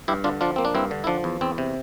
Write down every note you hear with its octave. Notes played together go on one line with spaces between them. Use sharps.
G2 E4 G4
D3 D4 F4
F3 D4 F4
A#3 C4
D4
G2 C4 E4
D3
E4
F3 D4
E2
E2 C4
C3